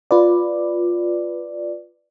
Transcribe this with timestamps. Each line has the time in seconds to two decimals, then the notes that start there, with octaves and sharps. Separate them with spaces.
0.11 F4 B4 D5